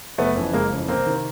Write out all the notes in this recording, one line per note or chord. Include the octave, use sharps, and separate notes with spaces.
F#1 A3 B3
F2 C#3 E3
F#1 G#3 A#3
F2 C#3 E3
C2 A#3 C4
C3 D#3